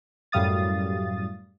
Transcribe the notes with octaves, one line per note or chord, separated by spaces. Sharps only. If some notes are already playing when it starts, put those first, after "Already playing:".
F#2 A2 G3 F5 D#6 A6